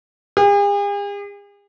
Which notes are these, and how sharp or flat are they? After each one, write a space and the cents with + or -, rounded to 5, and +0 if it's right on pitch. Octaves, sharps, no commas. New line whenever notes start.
G#4 -45